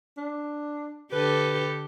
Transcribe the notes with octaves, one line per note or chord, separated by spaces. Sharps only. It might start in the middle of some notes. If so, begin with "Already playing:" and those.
D4
D3 G4 A4 B4